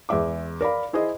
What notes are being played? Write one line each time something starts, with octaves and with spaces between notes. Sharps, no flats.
E2 G#3 E5 D6
A#4 D5 F5 B5
E4 G#4 C5 D#5